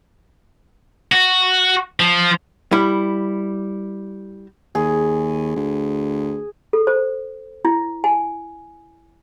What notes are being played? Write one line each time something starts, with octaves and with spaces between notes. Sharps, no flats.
F#4
F3
G3 E4
D#2 G#4
D2
A4
C5
E4
G#5